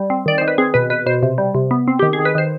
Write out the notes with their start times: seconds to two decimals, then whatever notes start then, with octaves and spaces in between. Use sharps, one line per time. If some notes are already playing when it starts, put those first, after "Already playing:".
Already playing: G3
0.10 C4
0.26 D#3 D5
0.38 D#3 C5
0.48 B4
0.58 C4 G#4
0.74 B2 B4
0.90 B2 B4
1.06 B2 C5
1.23 C3
1.38 G3
1.55 C3
1.71 B3
1.88 C4
1.99 D#3 G4
2.13 G#4
2.19 D#3
2.25 B4
2.35 D#3 C5